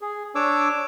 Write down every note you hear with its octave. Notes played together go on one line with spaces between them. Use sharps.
G#4
D4 C#5 D6 E6